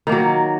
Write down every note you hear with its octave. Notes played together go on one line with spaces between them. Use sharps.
D#3 F#3 A#3